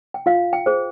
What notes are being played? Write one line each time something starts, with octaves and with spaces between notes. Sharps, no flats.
G5
F4 F5
G5
G#4 C5